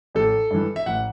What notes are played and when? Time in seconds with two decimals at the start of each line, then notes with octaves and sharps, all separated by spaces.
0.15 A1 A4
0.51 G2 E3
0.76 E5
0.86 A1 F#5